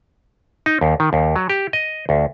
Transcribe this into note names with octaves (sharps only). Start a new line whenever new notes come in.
D#4
D#2
D#3
D#2
F#3
G4
D#5
D2